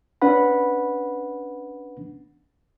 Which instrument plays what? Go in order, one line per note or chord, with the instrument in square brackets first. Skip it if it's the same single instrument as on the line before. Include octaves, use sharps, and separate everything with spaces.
[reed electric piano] C#4 D4 B4 F#5 B5